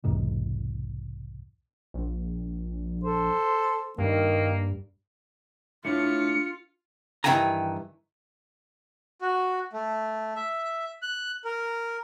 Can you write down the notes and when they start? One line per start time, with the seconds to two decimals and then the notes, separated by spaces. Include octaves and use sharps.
0.04 B1 E2 G#2 C3
1.94 A#1
3.04 A4 C5
3.98 G2 D#3 A#3
5.85 A3 D4 E4 F4 C#5 C#7
7.24 G2 D#3 E3 G5 G#5 A#5
9.21 F#4
9.73 A3
10.36 E5
11.02 F#6
11.45 A#4